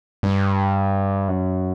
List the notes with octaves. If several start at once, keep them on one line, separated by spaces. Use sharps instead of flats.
G2
F#2